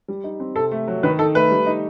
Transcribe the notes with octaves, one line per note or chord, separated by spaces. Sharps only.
G3
D#4
C4
C3 A4
A3
F#3
D#3 B4
D#4 A4
A3 B4
G3
D#4